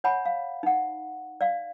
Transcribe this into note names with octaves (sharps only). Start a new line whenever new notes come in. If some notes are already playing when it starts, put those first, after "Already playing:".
C#5 F#5 G#5 B5
F5
D#4 F#5
D5 F5